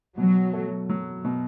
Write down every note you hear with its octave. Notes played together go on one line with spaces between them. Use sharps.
B2 F#3
A3
F#3
B2